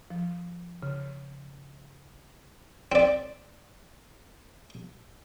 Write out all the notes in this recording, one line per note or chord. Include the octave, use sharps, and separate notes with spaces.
F3
C#3
C4 D5